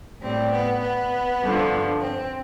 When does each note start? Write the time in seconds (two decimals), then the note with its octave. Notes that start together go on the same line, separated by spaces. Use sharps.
0.21 A2 G3 C4
0.51 B3
0.81 B3
1.41 G2 D3 F3
2.00 C4